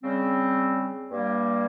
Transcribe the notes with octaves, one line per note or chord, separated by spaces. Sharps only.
C#3 G3 C4
G2 G3 A#3